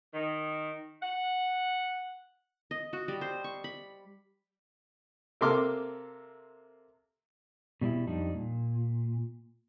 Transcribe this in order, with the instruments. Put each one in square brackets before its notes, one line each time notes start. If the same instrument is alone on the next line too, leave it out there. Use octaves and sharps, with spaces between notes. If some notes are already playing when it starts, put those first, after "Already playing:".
[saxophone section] D#3
F#5
[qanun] D#5
F#4
G3
C5
C#6
B5
[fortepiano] C3 A#3 A4 C6 D6 F6
[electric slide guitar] B2 G3 D4 E4
F2 G3 D4 D#4
A#2